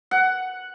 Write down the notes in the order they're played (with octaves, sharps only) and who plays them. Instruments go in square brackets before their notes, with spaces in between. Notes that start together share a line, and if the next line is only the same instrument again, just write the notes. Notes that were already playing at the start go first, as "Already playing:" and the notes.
[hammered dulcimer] F#5